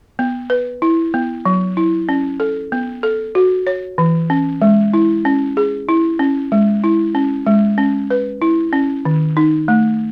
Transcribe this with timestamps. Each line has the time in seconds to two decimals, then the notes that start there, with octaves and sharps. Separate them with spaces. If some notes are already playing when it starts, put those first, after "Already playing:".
0.19 B3
0.50 B4
0.82 E4
1.14 B3
1.45 F#3
1.77 E4
2.09 C#4
2.40 A4
2.72 B3
3.03 A4
3.35 F#4
3.67 C#5
3.98 E3
4.30 C#4
4.62 G#3
4.94 E4
5.25 C#4
5.57 G#4
5.89 E4
6.19 C#4
6.52 G#3
6.84 E4
7.15 C#4
7.46 G#3
7.78 C#4
8.10 B4
8.42 E4
8.73 C#4
9.05 D#3
9.37 D#4
9.68 A3